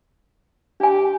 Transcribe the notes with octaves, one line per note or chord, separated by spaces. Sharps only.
D4 G4 G#5